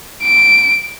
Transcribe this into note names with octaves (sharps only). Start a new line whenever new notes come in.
D7